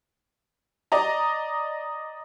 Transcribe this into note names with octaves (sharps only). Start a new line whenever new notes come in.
D5 D#5 A#5